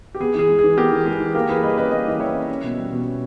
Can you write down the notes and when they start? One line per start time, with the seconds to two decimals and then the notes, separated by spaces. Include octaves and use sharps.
0.15 G4
0.20 B3 G#4
0.35 E3 G#4
0.49 G#3
0.59 G#4
0.64 E3
0.77 B3 G4 A#4
0.92 E3
1.06 G#3 G#4
1.20 E3
1.34 A#3 G4 A#4
1.49 E3 G#4 B4
1.63 G3 B4 D#5
1.78 C#4 B4 D#5
1.91 A#3 B4 D#5
2.07 E3 D#5
2.20 G3 C#5 E5
2.35 C#4
2.49 C#4
2.64 B2
2.78 G3
2.92 B2
3.05 C#4